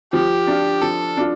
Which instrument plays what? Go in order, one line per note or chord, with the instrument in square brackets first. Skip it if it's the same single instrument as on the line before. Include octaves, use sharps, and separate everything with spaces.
[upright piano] F3 [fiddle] G4
[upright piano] D4 F4
[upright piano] F3 [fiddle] A4
[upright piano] D4 F4